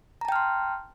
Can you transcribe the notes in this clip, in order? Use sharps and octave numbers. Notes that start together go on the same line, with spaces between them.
G5 A5 A#5 C6 F6